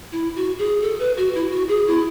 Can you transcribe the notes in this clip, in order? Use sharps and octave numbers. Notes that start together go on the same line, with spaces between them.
E4
F#4
G#4
A4
B4
F#4
E4
F#4
G#4
E4